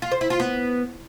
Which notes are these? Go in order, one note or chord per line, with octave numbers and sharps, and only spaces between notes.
F4
C5
E4
F4
B3